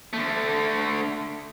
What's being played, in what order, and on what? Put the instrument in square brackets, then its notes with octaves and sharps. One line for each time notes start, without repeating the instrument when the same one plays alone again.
[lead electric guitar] D3 A3